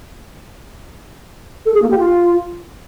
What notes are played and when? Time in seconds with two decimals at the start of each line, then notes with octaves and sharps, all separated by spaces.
1.66 A4
1.74 G#4
1.82 A#3
1.90 G4
1.99 F4